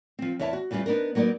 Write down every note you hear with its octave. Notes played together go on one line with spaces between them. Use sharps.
F3 C4
E2 E4 C#5 E5 G#5 A5
F#4
E2 E3 G3 C#4 F4
B3 D4 D#4 A#4
F#3 A#3 B3 D#4 D5